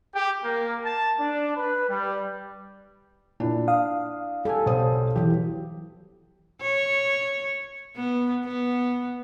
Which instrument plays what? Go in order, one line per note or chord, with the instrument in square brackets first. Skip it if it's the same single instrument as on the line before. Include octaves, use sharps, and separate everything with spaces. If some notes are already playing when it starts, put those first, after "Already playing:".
[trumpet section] G4
A#3
A5
D4
B4
G3
[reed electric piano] A#2 [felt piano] D4 E4
[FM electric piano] F5 [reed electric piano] D#6
[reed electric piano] G3 G4 G#5 [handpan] A4
[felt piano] B1 C5 D#6 [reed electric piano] B2 G3
[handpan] E3 F#3 [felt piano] G4
[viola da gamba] C#5
B3
B3